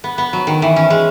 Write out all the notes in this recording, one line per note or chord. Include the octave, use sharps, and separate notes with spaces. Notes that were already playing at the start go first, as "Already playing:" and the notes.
B3
B3
F#3
D#3
E3
C#4
G#3